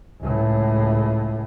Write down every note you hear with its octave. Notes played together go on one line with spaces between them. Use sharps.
C#2 A2